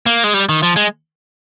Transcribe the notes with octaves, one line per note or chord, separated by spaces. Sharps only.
A#3
G#3
G3
D#3
F3
G#3